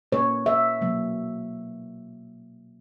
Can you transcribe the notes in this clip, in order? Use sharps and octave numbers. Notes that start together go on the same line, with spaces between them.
A#2 A#3 C#5
E5
B2 F#3 A#3